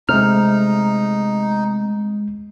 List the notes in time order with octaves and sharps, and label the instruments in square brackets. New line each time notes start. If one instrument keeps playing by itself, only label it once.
[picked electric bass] C3 A3 [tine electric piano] G#3 F6 [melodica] D#4